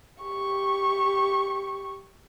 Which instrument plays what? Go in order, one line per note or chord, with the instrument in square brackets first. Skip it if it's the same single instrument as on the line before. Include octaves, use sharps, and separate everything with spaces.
[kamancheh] G4 C#6